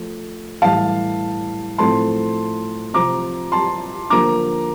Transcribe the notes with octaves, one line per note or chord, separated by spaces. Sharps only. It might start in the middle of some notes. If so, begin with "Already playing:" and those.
Already playing: F3 A3
A2 E3 G3 F5 A5
A2 F3 A3 C4 A5 C6
C3 F3 C4 A#5 D6
A5 C6
D3 F3 A#3 A#5 D6